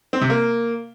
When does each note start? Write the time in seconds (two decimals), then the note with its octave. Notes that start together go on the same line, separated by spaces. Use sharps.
0.13 C4
0.21 C3
0.30 A#3